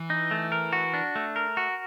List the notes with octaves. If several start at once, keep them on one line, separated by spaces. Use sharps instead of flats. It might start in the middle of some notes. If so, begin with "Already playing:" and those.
Already playing: E3
D#4
A3
A#4
F#4
D4
A3
A#4
F#4